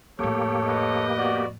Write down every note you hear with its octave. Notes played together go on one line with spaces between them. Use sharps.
F2 A2 A#3 G4 A4 C#5
B4 D#5
B3 F#4 D5